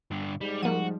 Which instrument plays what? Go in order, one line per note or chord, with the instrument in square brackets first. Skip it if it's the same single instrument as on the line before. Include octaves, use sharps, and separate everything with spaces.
[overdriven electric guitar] G2 D3
[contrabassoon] G#2 [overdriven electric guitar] G3
[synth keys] F3 G3 [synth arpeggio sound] A#3 D#7 [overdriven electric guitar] F#4